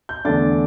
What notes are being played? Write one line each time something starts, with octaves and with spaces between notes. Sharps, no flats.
G6
E2 D3 A3 D4 A6